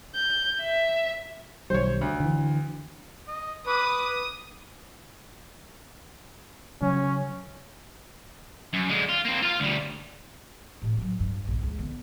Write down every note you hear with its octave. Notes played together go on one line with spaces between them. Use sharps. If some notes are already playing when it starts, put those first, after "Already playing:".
G6
E5
B1 D#3 G3 C5 C#5
D2
D3 E3
D#5
B4 D6 D#6
C#3 F#3 C#4
F#2
D3 G#3
F4
A#3 C4
F4 F5
D2 G3
A2 C3
F#3 G#3
G2
A#1 C3
C#2
D3 B3